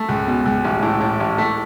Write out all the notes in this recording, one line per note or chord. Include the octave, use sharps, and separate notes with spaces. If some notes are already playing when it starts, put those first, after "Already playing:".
Already playing: A3
C#2
B2
C#2
A1
A2
A2
A1
A3